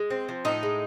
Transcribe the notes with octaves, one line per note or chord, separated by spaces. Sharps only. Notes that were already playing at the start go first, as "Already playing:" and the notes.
Already playing: G#3
C4
F3
A2 D#4
G#3